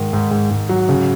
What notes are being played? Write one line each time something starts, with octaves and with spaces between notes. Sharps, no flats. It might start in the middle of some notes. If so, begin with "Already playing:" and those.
Already playing: G#2 D#3
G#2
G#2
G#2
F#3
C#3